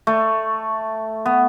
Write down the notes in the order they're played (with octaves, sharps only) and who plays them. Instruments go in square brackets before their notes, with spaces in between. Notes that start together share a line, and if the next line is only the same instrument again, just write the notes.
[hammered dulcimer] A3
B3